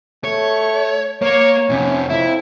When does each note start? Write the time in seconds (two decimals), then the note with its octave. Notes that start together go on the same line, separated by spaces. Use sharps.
0.24 A3 C#5
1.22 A#3 C#5
1.70 F2 C3 C#4
2.10 F2 E4